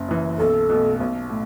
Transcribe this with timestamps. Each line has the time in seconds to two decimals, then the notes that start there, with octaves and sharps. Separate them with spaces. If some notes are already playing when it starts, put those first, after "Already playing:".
Already playing: F#1
0.08 F#2 E3
0.38 B1 A4
0.69 B2 A3
1.00 B1
1.30 A2